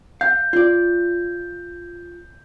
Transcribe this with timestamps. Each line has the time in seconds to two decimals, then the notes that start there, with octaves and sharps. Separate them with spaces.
0.21 F5 G6
0.53 F4 D5